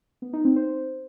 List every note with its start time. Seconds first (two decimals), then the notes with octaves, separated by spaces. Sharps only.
0.22 B3
0.33 D#4
0.45 C4
0.56 C5